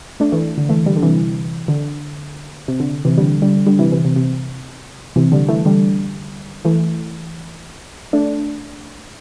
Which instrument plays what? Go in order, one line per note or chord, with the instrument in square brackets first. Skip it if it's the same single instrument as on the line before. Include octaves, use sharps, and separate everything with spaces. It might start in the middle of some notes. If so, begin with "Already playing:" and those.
[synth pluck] A3 D4
E3 A3
D3
E3 A3
D3 G3
D3
C3 E3
D3
C3
D3
C3 E3
D3 G3
D3 G3
D3 G3
C3 E3
C3 E3
C3
C3
C3 E3
D3 G3
E3 A3
D3 G3
E3 A3
A3 D4